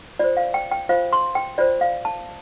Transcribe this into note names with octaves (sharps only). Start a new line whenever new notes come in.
F4 C5 D5
F5
G5
G5
F4 C5 F5
C6
G5
F4 C5 D5
F5
A5